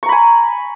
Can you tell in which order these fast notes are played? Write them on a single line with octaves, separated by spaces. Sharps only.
C#6 A#5 B5 G#5